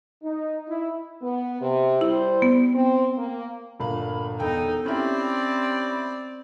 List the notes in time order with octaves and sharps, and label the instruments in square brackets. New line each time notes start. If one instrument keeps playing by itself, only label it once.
[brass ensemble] D#4
E4
[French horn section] B3
C3
[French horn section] G3 C5 [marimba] E4
[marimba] B3
[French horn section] C4
A#3
[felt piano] G1 A#2 F5 [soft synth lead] B5
[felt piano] E1 G5 [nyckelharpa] B3 D#4 [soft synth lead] A4
[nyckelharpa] C4 D5 [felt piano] C#4 E4 G4 [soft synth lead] B5